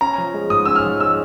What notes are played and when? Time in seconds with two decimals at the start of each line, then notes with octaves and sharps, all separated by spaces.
0.01 C#4 A#5
0.18 F3
0.34 G#3
0.50 G#2 D#6
0.65 C#4 E6
0.75 F6
0.84 F3
1.00 G#3 E6